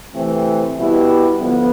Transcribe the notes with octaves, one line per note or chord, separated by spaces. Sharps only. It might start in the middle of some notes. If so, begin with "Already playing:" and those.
C3 E3 A3 C4
B2 G3 B3 E4 G4
D3 F3 B3